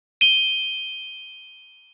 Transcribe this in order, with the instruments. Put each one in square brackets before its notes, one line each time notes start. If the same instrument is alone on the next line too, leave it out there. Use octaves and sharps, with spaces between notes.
[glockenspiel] D#7 G7